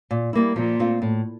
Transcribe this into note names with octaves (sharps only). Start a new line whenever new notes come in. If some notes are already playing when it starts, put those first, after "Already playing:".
A#2
G3 A#3 E4
A#2 F3
A3 C4 F4
A2